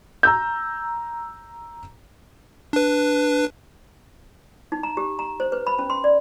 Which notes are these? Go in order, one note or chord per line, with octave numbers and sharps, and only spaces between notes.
A#5 E6 G6
D4 B4
D#4
A#5
G4
A#5
C5
B4
B5
C#4
C6
D5